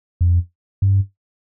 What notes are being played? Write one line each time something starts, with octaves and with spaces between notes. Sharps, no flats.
F2
G2